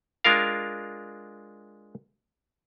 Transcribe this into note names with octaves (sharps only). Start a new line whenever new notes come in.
G#3 D4 F4 A#4 F5